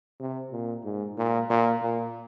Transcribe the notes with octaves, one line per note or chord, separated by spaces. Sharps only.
C3
A#2
G#2
A#2
A#2
A#2